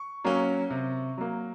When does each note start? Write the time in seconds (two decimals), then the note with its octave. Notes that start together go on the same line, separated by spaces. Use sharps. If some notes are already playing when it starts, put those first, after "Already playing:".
Already playing: C#6
0.24 F#3 A#3 C#4
0.70 C3
1.18 F#3 A#3